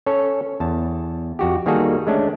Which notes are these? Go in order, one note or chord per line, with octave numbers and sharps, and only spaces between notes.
C#4 A4 C#5
E2 A5
F2 F#4 G4
D#3 G3 A#3 F#4 G#4 A4
G#3 A3 C#4 D4